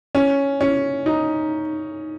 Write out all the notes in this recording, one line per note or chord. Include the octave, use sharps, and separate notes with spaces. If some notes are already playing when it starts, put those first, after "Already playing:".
C#4
C#4
D#4